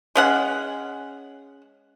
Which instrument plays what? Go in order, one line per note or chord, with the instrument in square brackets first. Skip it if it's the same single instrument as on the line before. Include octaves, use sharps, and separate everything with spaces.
[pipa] G#3 C#4 F#5